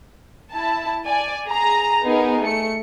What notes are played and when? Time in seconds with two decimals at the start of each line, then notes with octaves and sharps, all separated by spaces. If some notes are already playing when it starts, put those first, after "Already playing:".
0.51 E4 A5
1.06 D5 G#5
1.48 G#4 A#5
2.04 B3 D#4 G#4 A#4
2.42 A3 C#7